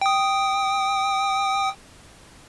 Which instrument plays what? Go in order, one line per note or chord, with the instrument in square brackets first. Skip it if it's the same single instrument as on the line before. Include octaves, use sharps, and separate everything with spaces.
[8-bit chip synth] G5 D#6